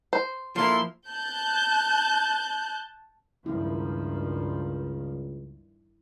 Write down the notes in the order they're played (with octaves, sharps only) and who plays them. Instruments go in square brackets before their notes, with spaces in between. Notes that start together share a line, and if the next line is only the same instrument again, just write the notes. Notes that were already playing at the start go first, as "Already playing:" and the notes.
[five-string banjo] C5
[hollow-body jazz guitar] F3 A#3 [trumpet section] E4 A4 C6
[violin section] A5 F#6 G6
[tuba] C#2 [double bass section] G2 D#3 F3 [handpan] E4